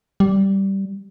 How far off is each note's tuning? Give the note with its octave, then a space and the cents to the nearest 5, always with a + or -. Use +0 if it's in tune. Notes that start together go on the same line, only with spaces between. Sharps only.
G3 -10